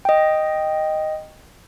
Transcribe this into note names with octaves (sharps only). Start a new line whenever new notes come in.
D#5 G5